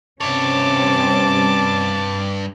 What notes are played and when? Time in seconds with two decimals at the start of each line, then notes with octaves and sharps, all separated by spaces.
0.21 G2 C3 C4 C#4 C#5 A5 D6